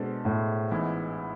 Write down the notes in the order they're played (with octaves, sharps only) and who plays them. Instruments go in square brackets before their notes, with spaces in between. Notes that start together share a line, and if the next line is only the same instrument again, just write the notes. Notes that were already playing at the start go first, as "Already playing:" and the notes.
Already playing: [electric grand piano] B2 G#3 D4 A4 C5
[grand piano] A2
[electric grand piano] A1 G#2 E3 B3 E4